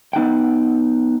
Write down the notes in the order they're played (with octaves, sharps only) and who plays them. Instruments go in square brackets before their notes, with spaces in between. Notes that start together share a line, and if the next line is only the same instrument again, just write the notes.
[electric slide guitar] B3 D#4 F#5 G5